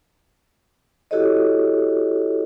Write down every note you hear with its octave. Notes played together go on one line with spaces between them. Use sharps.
E4 F#4 G4 A4 C#5 D#5